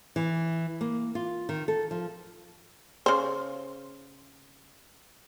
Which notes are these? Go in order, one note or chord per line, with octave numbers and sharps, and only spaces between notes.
E3
A#3
F4
D#3
A4
F3
C#3 C5